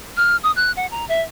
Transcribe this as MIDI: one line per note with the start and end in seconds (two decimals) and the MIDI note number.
0.17 0.37 89
0.43 0.52 87
0.56 0.72 90
0.77 0.86 78
0.91 1.07 82
1.09 1.22 76